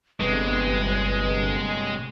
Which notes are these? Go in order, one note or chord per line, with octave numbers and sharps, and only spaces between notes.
G1 G2 C3 G#3 B4